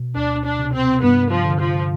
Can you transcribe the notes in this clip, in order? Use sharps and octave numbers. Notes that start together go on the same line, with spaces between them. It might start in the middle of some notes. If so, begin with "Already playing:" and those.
Already playing: B2
D2 D4
D4
C3
C4
G2 B3
F3
D3
F3